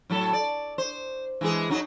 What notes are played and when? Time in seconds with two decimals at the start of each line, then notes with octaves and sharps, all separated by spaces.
0.10 A2 F#3 A4
0.33 D5
0.78 C5
1.41 E3 G#3 G#4
1.70 F#2 F#3 D#4